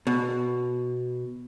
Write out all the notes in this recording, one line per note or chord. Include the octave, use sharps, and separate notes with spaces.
B2